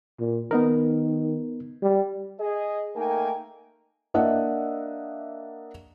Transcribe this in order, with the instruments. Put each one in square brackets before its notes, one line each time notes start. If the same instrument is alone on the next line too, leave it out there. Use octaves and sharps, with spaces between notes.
[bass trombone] A#2
[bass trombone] D#3 [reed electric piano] B3 D#4 A#4
[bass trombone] G3
[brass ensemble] G#4 D#5
A3 A#3 D#4 A#4 G5 G#5
[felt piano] A#3 D4 D#5 E5 F#5